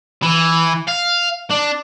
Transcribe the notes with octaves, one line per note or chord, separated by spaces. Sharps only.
E3
F5
D4